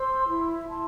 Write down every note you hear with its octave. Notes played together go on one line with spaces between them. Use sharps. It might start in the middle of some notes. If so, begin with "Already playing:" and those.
Already playing: C5 C6 E6
E4
E4 A5 C6